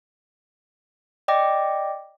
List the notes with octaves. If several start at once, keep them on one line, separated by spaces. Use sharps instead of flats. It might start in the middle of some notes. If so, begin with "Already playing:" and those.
D5 D#5 G5 D6 A#6